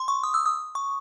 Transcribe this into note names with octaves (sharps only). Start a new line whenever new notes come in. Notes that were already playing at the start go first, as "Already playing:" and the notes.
Already playing: C6
C#6
D#6
E6
D#6
C#6